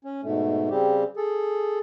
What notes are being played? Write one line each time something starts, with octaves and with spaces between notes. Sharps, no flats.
C#4
G#2 B2 A3
C#3 G3 C4 G4
G#4 A4